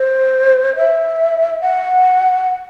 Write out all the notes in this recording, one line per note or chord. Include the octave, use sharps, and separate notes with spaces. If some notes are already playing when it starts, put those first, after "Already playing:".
Already playing: C5
E5
F#5